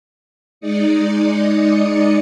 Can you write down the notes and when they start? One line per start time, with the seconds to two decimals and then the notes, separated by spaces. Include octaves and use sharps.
0.60 G#3 D#4 D5 D#6 C#7